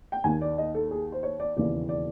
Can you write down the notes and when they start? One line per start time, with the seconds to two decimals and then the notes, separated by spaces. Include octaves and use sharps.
0.12 G5
0.24 D#2 D#3 G#5
0.41 D5
0.58 D#5
0.75 A4
0.91 G#4
1.12 C5
1.23 C#5
1.40 D5
1.57 E1 D#2 C#3 E3 D5
1.89 D5